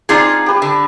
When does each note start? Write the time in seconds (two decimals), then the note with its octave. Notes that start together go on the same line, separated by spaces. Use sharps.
0.09 C4 D4 D#4 F4 G#4
0.46 G4 B4
0.62 D3